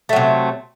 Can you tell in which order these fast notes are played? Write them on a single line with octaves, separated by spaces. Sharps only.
A3 F#3 C3